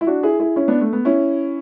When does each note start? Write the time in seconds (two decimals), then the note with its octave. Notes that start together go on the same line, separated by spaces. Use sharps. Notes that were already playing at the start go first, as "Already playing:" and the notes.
0.01 E4
0.07 D4 F#4
0.23 E4 G#4
0.40 E4 G#4
0.56 C#4 E4
0.68 B3 D4
0.81 A3
0.93 B3
1.05 C#4 E4